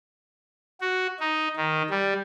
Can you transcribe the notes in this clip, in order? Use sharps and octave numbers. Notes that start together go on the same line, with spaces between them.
F#4
D#4
D#3
G3